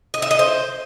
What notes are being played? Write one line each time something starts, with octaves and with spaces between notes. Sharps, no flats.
D#5
E5
D#5
C5